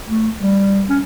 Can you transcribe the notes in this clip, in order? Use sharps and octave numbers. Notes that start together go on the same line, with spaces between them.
A3
G3
C#4